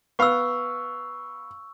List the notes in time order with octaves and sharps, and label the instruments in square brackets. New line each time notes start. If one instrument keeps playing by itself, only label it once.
[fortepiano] B3 F5 [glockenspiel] C#6 E6